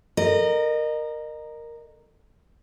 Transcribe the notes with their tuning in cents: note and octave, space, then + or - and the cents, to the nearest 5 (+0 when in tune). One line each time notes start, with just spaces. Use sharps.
A#4 +0 D#5 -30